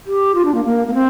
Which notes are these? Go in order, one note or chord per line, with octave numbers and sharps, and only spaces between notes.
G4
F4
D4
A#3
A#3
A#3
C4